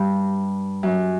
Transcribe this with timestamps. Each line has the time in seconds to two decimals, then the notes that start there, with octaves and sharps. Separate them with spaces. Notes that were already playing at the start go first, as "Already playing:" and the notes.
Already playing: G2
0.83 F#2